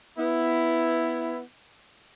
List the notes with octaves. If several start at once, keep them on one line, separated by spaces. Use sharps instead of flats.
B3 E4